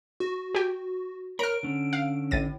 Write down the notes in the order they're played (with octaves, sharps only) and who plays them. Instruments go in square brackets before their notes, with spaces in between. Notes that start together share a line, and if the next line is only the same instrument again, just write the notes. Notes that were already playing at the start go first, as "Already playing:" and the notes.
[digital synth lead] F#4
[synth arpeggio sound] G4 G5
[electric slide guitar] A#4 C#5 [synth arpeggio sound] A#5 F6 [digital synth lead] D7
[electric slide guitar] D3 C#4
[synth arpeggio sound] F5
[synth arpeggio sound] A1 A6 D#7 [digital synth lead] A2